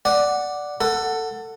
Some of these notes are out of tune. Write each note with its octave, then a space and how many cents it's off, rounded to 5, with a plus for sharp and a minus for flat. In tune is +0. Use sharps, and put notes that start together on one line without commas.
D5 +0 F#5 +0
A4 +20 F#5 +0